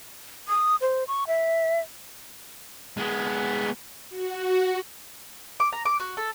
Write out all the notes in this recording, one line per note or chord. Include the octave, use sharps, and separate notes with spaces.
D#6
C5
C#6
E5
G#3 B3
F#4
D6
A#5
D6
F#4
A4